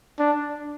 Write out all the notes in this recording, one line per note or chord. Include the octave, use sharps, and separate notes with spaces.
D4